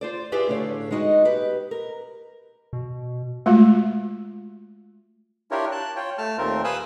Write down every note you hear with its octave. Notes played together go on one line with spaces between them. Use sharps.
F4 C5 D5
E4 F4 G4 G#4 B4 D5
A2 D3 C#5 F5
G#3 B3 D#4 F#4 D#5
G4 B4
A#4
B2
G#3 A3 F4 F#4
D4 E4 F4 G4 A#4 C#5
A5 F#6
F4 C#5 G5
A3 A5 F6
D#2 A#2 A3 C4 F4 A#4
B4 F5 G#5 D#6 E6 F#6